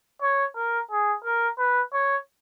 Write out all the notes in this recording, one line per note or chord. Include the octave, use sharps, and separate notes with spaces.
C#5
A#4
G#4
A#4
B4
C#5